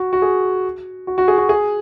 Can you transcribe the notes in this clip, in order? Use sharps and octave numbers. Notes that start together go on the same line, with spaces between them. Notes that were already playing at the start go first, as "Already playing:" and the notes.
Already playing: F#4
F#4
G#4
F#4
F#4
G#4
F#4
G#4